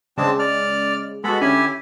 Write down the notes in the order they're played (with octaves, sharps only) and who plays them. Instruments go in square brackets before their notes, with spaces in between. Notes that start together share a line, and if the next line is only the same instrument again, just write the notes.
[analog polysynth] C#3 G#3 [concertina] C4 D4 A5
[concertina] D5 F6
[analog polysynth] G#3 F#4 [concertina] B3 A4 B5
[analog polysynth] D3 C#4 [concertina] E4 G4 G#5